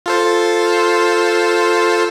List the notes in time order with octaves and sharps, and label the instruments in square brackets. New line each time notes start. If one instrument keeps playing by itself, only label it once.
[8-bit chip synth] F4 A4 C5